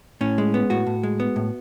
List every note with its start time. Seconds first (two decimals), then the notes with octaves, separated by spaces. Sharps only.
0.21 A2 C#4
0.38 G#3
0.54 B3
0.70 A2 F#4
0.87 A2
1.03 G#3
1.20 B3
1.36 A2